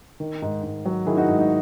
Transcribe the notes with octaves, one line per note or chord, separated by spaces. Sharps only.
D#3
G#2
G#2
F#3
D#3 E4 G#4
D#4 F#4
G#2
D#4